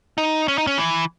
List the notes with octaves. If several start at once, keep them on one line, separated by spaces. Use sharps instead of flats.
D#4
C#4
D#4
C#4
E3